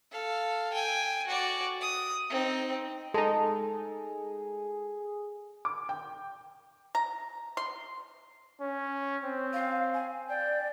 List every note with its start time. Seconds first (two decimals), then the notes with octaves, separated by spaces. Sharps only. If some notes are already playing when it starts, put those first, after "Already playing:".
0.11 A4 F5
0.73 G5 G#5
1.26 F#4 D5
1.81 D#6
2.30 C4 D#4
3.14 G#3 D#4 G#4 A4 A5
5.65 D6
5.89 G5
6.95 A#5
7.57 C6
8.61 C#4
9.24 C4
9.53 F5
9.94 G#5
10.29 D5 G5